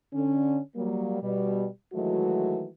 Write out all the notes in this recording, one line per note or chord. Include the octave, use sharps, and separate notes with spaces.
D3 C#4
F#3 G3 A#3
B2 G3
D#3 E3 F#3 G#3 A3 F#4